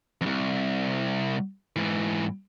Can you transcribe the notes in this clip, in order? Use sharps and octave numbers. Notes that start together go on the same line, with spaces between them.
C2 F2
G#2 E3